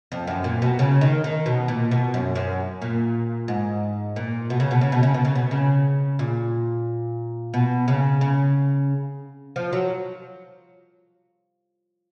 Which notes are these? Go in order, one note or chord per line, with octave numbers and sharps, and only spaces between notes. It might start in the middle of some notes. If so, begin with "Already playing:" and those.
F2
F#2
A#2
B2
C#3
D#3
D#3
B2
A#2
B2
F#2
F#2
A#2
G#2
A#2
B2
C#3
B2
C#3
B2
C#3
B2
C#3
B2
C#3
A#2
B2
C#3
C#3
F3
F#3